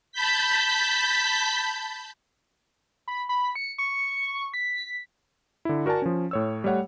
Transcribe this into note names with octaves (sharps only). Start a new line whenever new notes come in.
A5 B5 G6 B6
B5
B5
C#7
C#6
B6
D3 E4
F#4 A#4 D5 G#5 A5
F3 C#4
A2 C#5 E6
G3 A3 C#5 F#5